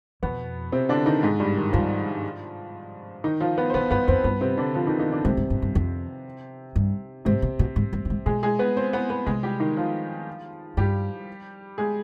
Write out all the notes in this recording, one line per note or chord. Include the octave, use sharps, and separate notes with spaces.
F2 B2 B3
C3 C4
D3 D4
D#3 D#4
G#2 G#3
G2 G3
D#3
G2 F3
D#3 D#4
F3 F4
B3 B4
C5
B2 B3 B4
G2 B3 B4
F2 C4 C5
G2 B3 B4
C3 C4
D3 D4
F3 F4
D#3 D#4
D#3 D#4
D3 D4
G#2 C3 C4
G#2
G2
G2
F2
G2
G#2 C3 C4
B2
B2
G#2
G2
G2
G#2
B2 G#3 G#4
G#3 G#4
B3 B4
C4 C5
B3 B4
B3 B4
C3 G#3 G#4
G3 G4
D#3 D#4
F3 F4
G2 G3 G4
G#3 G#4